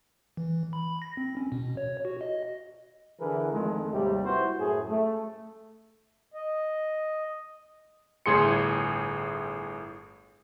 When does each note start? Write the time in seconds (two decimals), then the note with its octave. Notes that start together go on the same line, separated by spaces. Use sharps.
0.37 E3
0.73 B5
1.02 A#6
1.17 C4
1.37 C#4
1.52 B2
1.77 C#5
2.05 F#4
2.21 D#5
3.20 D3 E3 G#4 A#4 B4
3.52 F2 D#3 G#3 A3
3.92 G#1 D#2 C3 G3
4.24 E4 F#4 B4 C5
4.59 F#2 A2 G#4
4.89 A3
6.34 D#5
8.26 G1 A2 G#4 C6 C#7